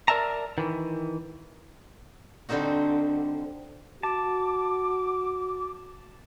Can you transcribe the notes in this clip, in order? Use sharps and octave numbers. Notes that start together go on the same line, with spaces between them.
A#4 D5 E5 A5 A#5
D#3 E3
D3 G3 C4 D#4 F#4
F#4 A5 D6